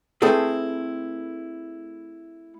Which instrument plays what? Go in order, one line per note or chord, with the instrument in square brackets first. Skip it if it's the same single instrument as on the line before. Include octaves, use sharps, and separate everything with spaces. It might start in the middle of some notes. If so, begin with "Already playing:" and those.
[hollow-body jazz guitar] A3 C4 E4 G#4 A4 B4